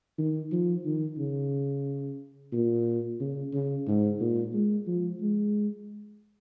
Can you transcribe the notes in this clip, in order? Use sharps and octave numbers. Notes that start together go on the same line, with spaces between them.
D#3
F3
D#3
C#3
A#2
C#3
C#3
G#2
A#2
G#3
F3
G#3